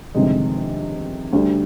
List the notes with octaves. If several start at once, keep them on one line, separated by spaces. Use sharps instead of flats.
G1 F2 C3 D#3 G#3
D2 D3 G3